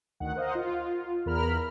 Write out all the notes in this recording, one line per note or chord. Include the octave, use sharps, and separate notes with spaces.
D2 D#3 F#5
A#4 C5 D#5 F5 F#5
F4
E2 A#4 B5 F6